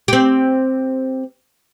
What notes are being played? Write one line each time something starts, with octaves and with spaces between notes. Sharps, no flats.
C4 G4